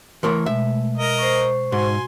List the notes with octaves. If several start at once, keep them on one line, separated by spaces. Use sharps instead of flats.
E3 A3 A#4 C#5 C6 D#6
B2 G#3 E5
A#4 D#5
C5 C#6
G#2 F#4 G#5 C6